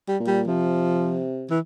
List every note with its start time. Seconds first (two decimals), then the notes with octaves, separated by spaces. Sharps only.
0.08 G3
0.20 A#2
0.27 G3
0.47 C3 F3
1.50 E3